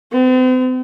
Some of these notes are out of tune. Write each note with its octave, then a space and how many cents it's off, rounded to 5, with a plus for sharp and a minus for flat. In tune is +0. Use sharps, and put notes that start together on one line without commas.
C4 -45